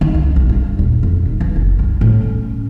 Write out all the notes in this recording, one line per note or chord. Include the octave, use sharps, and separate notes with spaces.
D#3
C#2
B1
G2
D#1
F2
D#4
E3
F#1
C2
A2
C#4